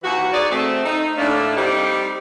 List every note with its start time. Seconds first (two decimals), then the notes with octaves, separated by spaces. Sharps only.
0.02 D#2 E3 F#4
0.32 D#4 G#4 D5
0.50 A3 C4
0.84 D#4
1.16 A2 A3 A#3 D4
1.56 G3 C4 D#4 G4